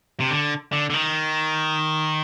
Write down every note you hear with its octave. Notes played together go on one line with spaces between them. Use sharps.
C3
D3
D3
D3
D#3